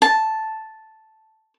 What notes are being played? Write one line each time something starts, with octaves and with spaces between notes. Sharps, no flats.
A5